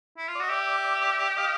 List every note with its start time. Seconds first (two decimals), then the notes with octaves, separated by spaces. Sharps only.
0.18 E4
0.28 F4
0.35 D5
0.40 F#4 D#5
0.50 G4 D5 E5
1.37 D#5 F5